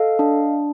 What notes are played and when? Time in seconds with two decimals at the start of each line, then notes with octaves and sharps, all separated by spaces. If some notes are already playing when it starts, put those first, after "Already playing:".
Already playing: A4 D#5 F5
0.19 D4